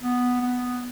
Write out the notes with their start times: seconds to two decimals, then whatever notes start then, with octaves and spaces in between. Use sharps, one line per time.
0.02 B3
0.42 B3